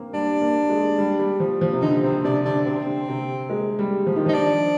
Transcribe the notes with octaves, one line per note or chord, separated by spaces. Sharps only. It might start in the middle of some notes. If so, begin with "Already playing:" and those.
Already playing: A#3 C4
G3 D4
A#3
G#3
G3
G3
F3
F3
C3
D3 D#4
C3 C4
C3 D4
D3 D4
C3 C4
D3
C3
G#3
G3
F3
D#3
F3 D#4
D4